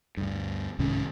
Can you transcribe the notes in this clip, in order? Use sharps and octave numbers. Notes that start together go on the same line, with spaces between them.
D2 G2
C2 G#2 D#3 C#4